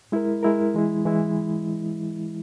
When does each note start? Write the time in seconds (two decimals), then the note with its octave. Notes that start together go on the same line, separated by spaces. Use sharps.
0.12 G#3 E4 A#4
0.43 G#3 E4 A#4
0.74 E3 G#3 E4
1.05 E3 G#3 E4